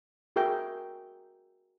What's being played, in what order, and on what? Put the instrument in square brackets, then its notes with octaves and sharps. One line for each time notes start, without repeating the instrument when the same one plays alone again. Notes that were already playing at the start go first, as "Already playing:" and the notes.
[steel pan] F#4 G#4 A#4 E5 G5